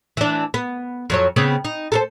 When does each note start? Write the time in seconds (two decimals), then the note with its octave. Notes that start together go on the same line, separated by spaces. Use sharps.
0.17 E3 D4
0.54 B3
1.10 F2 F#3 C#5
1.36 C#3 B3 C4
1.65 D#4
1.92 A4 A#4 C5